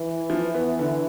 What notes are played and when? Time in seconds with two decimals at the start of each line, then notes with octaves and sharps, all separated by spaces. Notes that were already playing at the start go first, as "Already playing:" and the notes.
Already playing: E3
0.30 F3
0.54 B3
0.79 D3